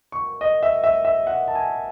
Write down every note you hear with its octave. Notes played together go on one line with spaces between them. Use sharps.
C#6
D#5
E5
E5
E5
F#5
A5
G#5